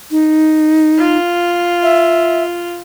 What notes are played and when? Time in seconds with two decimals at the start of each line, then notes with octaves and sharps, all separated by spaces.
0.11 D#4
0.98 F4
1.83 E5